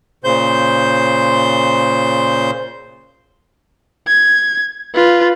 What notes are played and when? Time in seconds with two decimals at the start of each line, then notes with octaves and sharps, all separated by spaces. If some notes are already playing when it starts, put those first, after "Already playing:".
0.24 A#2 C#3 C5 G6
4.07 G#6
4.94 F4 B4